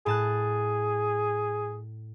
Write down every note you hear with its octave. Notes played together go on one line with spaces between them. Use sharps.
A2 G#4 A5 F#6